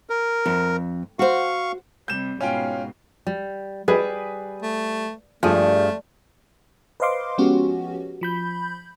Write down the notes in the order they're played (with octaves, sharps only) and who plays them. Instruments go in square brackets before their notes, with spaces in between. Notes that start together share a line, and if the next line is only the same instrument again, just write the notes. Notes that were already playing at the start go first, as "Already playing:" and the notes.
[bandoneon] A#4
[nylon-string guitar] F2
[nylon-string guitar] F#4 C5 [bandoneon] F5 C#6
[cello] C3 G3 [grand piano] G6 E7
[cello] G#2 B2 [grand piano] C#4 F4 G5
[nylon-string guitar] G3
[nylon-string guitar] G3 [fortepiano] G#4 B4 G#5
[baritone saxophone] A3
[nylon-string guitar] G2 G#4 [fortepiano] F3 [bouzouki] G3 [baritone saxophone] A3
[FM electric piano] B4 C5 D#5 F5 C6 D6
F3 G#3 B3 C#4 F#4 G4
F3 B5 G6